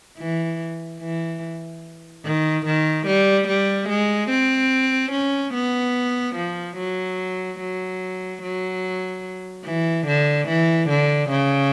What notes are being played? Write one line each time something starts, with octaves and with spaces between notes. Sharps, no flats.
E3
E3
D#3
D#3
G3
G3
G#3
C4
C#4
B3
F3
F#3
F#3
F#3
E3
D3
E3
D3
C#3